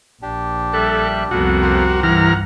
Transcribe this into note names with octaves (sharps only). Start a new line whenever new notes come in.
A#1 D4 G4
G3 A4 E5 F#6
C2 F2 A#3 B3 F#4 A4
G4 A#4 C5
G2 E3 F#5 A#5 F6